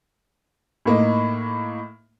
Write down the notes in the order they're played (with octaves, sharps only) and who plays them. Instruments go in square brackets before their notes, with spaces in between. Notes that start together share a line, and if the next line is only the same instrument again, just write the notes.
[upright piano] A2 A#3 D#4